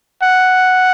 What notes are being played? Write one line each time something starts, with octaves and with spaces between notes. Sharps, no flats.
F#5